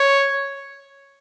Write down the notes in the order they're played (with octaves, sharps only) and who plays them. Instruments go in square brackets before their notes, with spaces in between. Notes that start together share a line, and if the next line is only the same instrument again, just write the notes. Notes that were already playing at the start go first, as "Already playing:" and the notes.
Already playing: [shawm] C#5